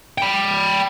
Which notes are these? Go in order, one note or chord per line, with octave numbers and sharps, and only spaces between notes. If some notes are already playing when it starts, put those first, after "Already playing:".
G5 B5